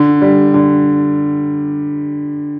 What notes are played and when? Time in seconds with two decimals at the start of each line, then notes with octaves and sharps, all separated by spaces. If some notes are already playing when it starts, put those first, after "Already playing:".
Already playing: D3
0.21 G3
0.54 D3